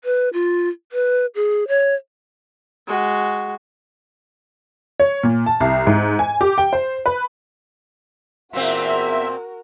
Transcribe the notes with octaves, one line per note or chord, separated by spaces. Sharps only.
B4
F4
B4
G#4
C#5
G#3 F#4
C#5
A#2
A5
C2
G#2
G#5
G4
G5
C5
B4
E2 A#2 A#3 C4 F#4 A#4 E5